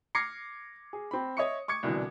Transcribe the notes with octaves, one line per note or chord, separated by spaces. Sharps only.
D6 F6 G#6 A#6 C7 C#7
G#4
C4 B5
C#5 D#5 E5 C#6 D#6 C#7
C#6 D6 G#6 C#7
C2 B2 D3 E3